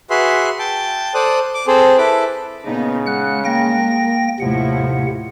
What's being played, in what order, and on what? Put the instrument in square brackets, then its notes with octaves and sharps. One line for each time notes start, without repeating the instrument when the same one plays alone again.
[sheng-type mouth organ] F#4 G#4 B4 E5 C6
G5 A5
A4 C5 D5 D#6 F#6
D6
C4 G#4 A4 C5
E4 A4 B4 D6
[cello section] A#2 B3 D#4 [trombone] C#3
[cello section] G#3 [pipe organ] F#5 F#6
[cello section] G#3 A#4 [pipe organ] A#3 G5 A#6
[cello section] D#2 A2 E4 [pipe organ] C3 F#5 [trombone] F3